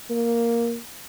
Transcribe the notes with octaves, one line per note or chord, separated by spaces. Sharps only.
A#3